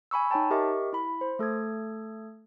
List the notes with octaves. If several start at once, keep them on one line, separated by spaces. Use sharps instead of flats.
G#5 B5 C#6 E6
D#4 C#5 G5 A5
G4 A#4 D#5 E5 C#6
E4 B5
C5
A3 A4 D#6 G#6